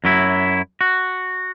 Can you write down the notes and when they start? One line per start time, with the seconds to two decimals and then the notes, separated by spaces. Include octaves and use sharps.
0.04 F#2 F#3 E4
0.81 F#4